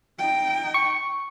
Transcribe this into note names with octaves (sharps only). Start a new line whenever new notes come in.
D#4 G5
C#6